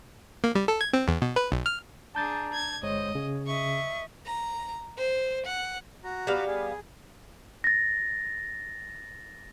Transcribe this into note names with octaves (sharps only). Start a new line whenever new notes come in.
A#3
G3
A4
G#6
C4
E2
B2
B4
B1
F6
D4 G#4 A5 A#5 G6 A6
G#6
G1 G#3 C5 C#5 D#5
C#3 C#5
D#5 E5 C#6
A#5
C5
F#5
F#4 A#5
G3 B3 F5
G#4
A6 A#6